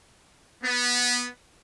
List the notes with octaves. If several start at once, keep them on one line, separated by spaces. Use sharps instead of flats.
B3